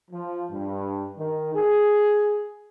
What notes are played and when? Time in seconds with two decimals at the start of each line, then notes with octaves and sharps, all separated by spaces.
0.11 F3
0.50 G2
1.17 D#3
1.54 G#4